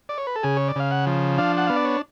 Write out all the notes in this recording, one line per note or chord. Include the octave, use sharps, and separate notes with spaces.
D5
C#5
B4
A4
C#3 G#4
C#5
D5
C#3 F5
F#5
F3
D4 F5
F#5
B3 F5
D5
C#5